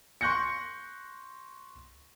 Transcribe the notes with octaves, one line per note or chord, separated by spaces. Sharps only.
C6 C#6 F#6 G6 A#6 C#7